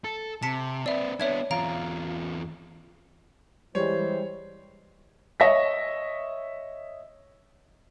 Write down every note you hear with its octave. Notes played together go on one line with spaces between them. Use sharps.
A4
C3 A5 B6 C#7
C4 B4 D5 E5
B3 D4 C#5 E5 G#6
E2 F4 F5 A#5 D7
E3 G3 G#3 C5 C#5
C#5 D#5 E5 A#6 B6